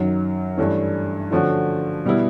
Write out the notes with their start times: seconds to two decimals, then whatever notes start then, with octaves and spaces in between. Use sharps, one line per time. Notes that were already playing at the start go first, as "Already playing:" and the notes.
Already playing: F#2 D#3 F#3
0.57 G2 E3 A3 C#4
1.31 D3 F3 A3 C#4 F#4
2.05 B2 G3 B3 E4